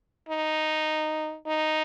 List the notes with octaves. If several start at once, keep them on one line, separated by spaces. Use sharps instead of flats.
D#4
D#4